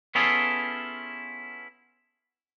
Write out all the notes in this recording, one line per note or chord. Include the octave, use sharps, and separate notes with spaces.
B3 C#4 E4 F4 G#4 A4